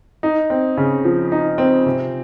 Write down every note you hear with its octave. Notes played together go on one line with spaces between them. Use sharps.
D#4
C4
C#3
F3
D#4
C4
C3